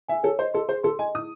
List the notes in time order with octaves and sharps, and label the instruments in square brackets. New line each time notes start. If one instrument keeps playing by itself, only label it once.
[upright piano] E5 [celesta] G#5
[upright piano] A4 [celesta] C#5
[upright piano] C5 [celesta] D#5
[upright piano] A4 [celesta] C6
[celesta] G#4 [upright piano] C5
[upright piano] A4 [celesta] C6
[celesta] D#5 [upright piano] G#5
[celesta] E4 [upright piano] D#6